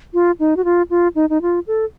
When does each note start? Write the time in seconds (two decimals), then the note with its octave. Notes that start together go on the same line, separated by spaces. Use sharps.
0.14 F4
0.40 D#4
0.57 F#4
0.65 F4
0.90 F4
1.15 D#4
1.30 D#4
1.42 F4
1.67 A4